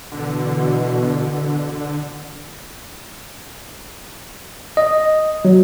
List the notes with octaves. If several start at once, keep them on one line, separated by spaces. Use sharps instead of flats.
B2 D3 E3
D#5
F#3